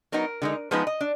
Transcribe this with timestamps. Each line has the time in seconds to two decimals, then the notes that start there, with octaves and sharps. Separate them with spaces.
0.12 F#3 B3 D#4 A#4
0.42 D3 G#3 D#4
0.71 F3 G#3 B3 D#4 B4
0.87 D#5
1.01 D4